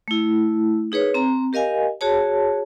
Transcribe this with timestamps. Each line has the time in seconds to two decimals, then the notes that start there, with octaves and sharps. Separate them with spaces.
0.08 A3 E4
0.92 D#4 G#4 B4 C#5
1.14 C4 A#5
1.53 G4 A#4 D#5 F5 G#5
2.01 F#4 G#4 C#5 A5